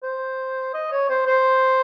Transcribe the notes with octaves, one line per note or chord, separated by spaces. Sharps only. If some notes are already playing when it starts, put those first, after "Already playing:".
C5
D#5
C#5
C5
C5